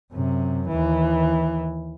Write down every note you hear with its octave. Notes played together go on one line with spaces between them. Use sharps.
F#2 C3
D#2 E3